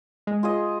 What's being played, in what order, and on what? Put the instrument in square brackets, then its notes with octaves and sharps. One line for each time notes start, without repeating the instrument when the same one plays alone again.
[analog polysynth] G#3
[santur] F4 G#4 D#5